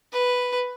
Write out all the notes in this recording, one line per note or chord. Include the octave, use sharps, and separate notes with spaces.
B4